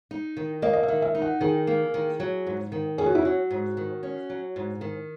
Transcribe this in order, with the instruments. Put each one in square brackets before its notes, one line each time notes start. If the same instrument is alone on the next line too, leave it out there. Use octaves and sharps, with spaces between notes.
[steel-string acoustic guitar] D#4
D#3
[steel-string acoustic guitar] A#3 [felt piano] D#5
[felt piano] D#5
E5
[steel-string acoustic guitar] D#3
[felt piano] E5
[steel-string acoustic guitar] D#4
[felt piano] F#5
[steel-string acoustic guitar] D#3 [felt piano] G#4
[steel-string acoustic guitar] A#3
D#3
F#3
G#2
D#3
[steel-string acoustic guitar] C#4 [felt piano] G#4
[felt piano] F#4
E4
[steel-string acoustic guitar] F#3 [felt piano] F#4
[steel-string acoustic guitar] G#2
D#3
C#4
F#3
G#2
D#3